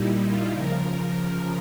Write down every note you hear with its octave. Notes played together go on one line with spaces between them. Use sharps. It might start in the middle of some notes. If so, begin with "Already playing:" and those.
Already playing: A#2 G3 D#4 E4
F4
C#3 F3 A#4
A#4